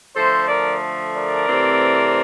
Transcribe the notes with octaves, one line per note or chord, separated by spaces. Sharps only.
D3 F3 A3 A4 C5
A#4 D5
A#4 D5
C3 E3 A3 C4